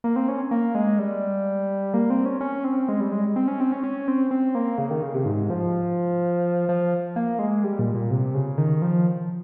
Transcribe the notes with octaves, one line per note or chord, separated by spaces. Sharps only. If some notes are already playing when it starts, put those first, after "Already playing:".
A#3
C4
C#4
A#3
G#3
G3
A#3
C4
C#4
C#4
C4
G#3
G3
G#3
C4
C#4
C4
C#4
C#4
C4
C4
A#3
C#3
D#3
C#3
C3
G#2
F3
F3
A#3
G#3
G3
A#2
A#2
C3
C#3
D#3
F3